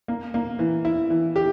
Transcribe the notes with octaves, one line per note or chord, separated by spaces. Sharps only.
A#3
A#3
E3
E4
E3
G4